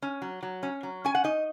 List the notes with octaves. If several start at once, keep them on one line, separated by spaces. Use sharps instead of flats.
C#4
F#3
F#3
C#4
F#3
C#4 G#5
F#5
D#4 D#5